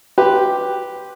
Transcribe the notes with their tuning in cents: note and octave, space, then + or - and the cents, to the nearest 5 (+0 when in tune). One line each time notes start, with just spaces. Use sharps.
G4 +0 B4 +0 C6 +0